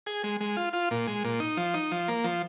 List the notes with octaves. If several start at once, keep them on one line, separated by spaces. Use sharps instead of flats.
G#4
G#3
G#3
F4
F4
A#2
G#3
A#2
D#4
F3
D#4
F3
A#3
F3